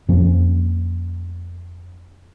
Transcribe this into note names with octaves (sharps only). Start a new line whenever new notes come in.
F2 F3 A#3 C#4